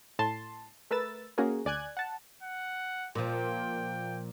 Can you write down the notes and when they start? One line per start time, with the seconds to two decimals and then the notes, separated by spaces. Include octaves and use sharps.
0.19 A2 A5 C6
0.91 A3 A#4 B4 E6 A6
1.38 A#3 C#4 F#4 G#4 A#4
1.65 D2 D5 G#5 F#6 G#6
1.97 F#5 A5
2.43 F#5
3.15 A#2 F3 G5